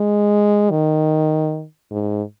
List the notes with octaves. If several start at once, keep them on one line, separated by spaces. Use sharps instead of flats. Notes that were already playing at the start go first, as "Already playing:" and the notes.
Already playing: G#3
D#3
G#2